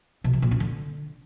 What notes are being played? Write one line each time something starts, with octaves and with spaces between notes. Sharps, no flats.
B2
E3
A#2
C#4
D3